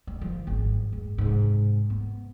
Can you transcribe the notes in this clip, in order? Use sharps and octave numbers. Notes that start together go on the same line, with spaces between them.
G3
D#3 F3
G#1 F#2
G#2
G#2 C3
B3